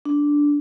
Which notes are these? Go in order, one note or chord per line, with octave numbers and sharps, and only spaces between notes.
D4